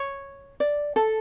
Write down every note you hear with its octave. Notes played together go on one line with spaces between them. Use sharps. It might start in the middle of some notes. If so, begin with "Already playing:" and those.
Already playing: C#5
D5
A4